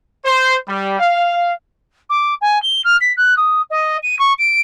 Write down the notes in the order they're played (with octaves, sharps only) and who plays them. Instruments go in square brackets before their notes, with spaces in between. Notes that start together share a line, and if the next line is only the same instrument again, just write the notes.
[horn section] C5
G3
F5
[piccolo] D6
G#5
G7
F6
B6
F#6
D#6
D#5
D#7
C#6
D7